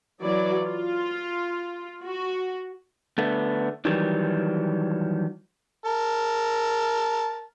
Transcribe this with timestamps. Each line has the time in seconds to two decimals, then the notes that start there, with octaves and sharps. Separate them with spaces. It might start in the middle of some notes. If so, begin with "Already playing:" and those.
0.23 E3 F#3 D5
0.63 F4
2.04 F#4
3.18 D3 A3 B3
3.85 D#3 E3 F#3 G3
5.85 A#4 A5